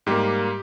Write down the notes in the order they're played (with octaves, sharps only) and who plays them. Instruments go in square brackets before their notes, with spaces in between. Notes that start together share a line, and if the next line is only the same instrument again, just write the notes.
[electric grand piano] G#2 G3 A#3 G4